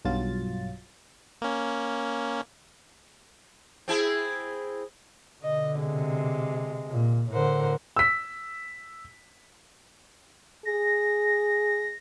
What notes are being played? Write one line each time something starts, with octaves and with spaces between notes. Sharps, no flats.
B1 G2 F#3 F4 A6
A#3 C#4
C4 E4 G#4
B2 D3 D#5
C3 G#3
A#2
A2 D3 A#4 C5 F#5
E6 B6
G#4 A#6